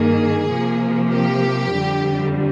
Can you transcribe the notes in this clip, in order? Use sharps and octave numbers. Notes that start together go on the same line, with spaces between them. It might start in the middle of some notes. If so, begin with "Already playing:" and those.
Already playing: G2 D#3 A#3 G#4
C3 F3 A#3
G4
F2 D3 G3